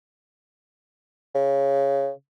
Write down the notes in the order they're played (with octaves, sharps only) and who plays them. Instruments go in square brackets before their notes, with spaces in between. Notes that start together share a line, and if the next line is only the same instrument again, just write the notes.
[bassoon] C#3